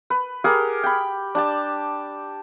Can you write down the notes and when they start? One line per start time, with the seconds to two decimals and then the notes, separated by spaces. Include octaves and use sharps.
0.10 B4
0.44 G4 G#4 A#4 F#5
0.83 G5 B5
1.35 D4 G4 A5